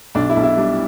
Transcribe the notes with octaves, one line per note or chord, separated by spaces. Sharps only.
B1 D4
E4
B1
E4
G3 D4